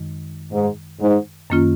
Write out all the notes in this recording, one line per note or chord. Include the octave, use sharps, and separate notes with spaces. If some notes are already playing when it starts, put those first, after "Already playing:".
Already playing: F#2 D#3 G#3 D#4
G#2
G#2
F#2 D#3 A#3 C#4 F4